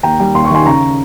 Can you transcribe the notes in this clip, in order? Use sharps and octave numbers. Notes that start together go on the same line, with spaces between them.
D#2 G5 A#5
G3
D#2 C6
C#6
D#3 G#5 C6
C#3 A#5 C#6